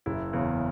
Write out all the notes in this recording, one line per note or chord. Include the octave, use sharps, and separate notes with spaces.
F#1 E4
E2 C#3